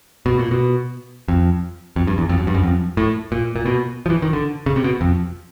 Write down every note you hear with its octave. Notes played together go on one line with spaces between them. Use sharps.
B2
A#2
B2
F2
F2
G2
E2
F2
F#2
G2
F#2
F2
A2
A#2
A#2
B2
F3
E3
D#3
D3
C#3
C3
B2
F2